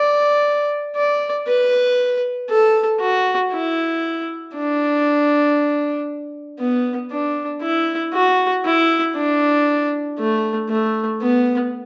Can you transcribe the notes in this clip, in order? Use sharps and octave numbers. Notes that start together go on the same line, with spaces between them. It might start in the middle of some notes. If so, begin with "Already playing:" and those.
Already playing: D5
D5
B4
A4
F#4
E4
D4
B3
D4
E4
F#4
E4
D4
A3
A3
B3